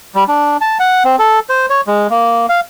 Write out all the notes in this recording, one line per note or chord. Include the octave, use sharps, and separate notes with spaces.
G3
D4
A5
F#5
C4
A4
C5
C#5
G#3
A#3
F5